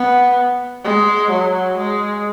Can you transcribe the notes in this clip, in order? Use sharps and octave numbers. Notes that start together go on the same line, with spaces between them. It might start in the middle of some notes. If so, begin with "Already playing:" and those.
Already playing: B3
G#3
F#3
G#3